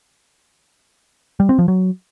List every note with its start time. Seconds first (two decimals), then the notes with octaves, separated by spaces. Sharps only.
1.40 G3
1.49 C4
1.59 F3
1.68 F#3